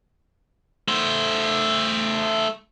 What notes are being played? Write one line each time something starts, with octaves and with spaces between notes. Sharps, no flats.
A3 C5